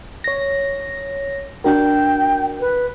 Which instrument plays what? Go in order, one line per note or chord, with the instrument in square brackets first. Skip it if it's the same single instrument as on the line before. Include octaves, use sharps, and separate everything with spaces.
[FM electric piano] C#5 A#6
[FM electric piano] D4 F#4 A#4 [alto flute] G5
[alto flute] B4